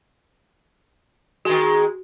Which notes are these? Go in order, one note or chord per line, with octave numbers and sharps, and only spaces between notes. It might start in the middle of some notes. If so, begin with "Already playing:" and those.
D#3 G#3 F#4